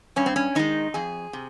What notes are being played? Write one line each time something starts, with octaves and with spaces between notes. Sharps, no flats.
G2 C#4
C4
C#4
D#3 G#3 D#4
F2 G#4
C3